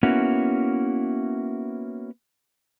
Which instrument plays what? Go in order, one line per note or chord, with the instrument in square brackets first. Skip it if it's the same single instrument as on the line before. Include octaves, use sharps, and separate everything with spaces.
[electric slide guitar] A#3 B3 C#4 E4 F#4